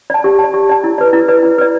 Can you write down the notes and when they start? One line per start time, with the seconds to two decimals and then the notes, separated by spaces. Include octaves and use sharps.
0.10 D5 A5
0.24 G4
0.39 A5
0.44 D5
0.54 G4
0.69 D5 A5
0.84 E4
0.98 B4 D5
1.13 E4
1.28 B4 D5
1.43 E4
1.58 B4 D5